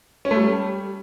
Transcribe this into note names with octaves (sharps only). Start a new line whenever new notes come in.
C#4
A3
G3